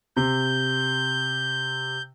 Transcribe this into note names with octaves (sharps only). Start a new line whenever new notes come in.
C3 G6